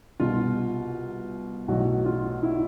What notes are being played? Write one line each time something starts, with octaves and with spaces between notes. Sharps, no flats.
C2 B2 F4
B1 A2 E3 F#4
F4
E4